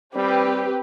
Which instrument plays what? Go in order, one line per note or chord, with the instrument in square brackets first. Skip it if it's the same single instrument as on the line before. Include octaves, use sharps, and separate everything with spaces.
[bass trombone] G3 [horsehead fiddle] C4 [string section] G4 B4